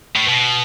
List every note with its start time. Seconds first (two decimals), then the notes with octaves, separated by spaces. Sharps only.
0.16 A2
0.28 B2